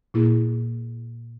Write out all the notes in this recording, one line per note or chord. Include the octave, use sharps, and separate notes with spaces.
A#2 A#3 E4 G#4